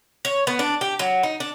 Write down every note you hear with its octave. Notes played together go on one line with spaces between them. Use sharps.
C#5
B3
D4
G4
F#3
D#4
D4